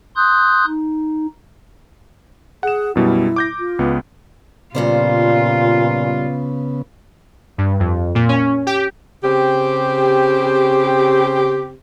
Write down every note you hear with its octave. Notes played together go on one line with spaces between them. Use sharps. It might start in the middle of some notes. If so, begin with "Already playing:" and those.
C6 D#6 F#6 G6
D#4
G#4 F#5 E7
F#2 B2 G3 E4
D6 G6 A#6
F4
C#2 B3
G2 A#2 C#3 G3 B3 F4 C5
G2
F2
A#2
C#4
G4
C#3 C4 G4